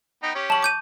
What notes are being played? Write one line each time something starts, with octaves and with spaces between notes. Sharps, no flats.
B3 D#4 G5
C#4 G4 C#5
A5 C#6 E7 F#7
D6 G6 D#7